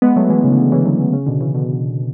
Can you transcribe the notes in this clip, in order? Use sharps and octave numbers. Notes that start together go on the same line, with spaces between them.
G#3 B3
F#3 A3
E3 G#3
C#3
D3
C#3
C#3 E3
D3 F#3
C#3
C#3
B2 D3
C#3 E3
B2 D3